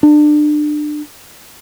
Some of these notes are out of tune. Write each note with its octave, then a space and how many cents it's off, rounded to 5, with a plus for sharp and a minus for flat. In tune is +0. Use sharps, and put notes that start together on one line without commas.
D4 +30